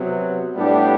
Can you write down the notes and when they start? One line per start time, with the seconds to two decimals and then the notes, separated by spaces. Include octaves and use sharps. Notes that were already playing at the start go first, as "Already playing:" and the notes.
Already playing: C3 F#3 B3
0.55 A2 G3 B3 D4 G4